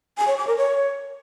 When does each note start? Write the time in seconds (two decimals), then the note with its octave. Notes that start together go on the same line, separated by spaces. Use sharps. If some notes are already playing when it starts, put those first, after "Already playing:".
0.18 G#5
0.28 C#5
0.37 D6
0.47 A#4
0.57 C#5